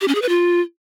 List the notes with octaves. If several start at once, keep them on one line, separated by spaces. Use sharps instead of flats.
G4
C#4
G#4
B4
F4